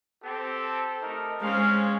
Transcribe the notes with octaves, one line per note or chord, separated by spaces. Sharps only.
C4 G4 A4
A3 D#4 A#4
G#3 C4 C#4 C5 F5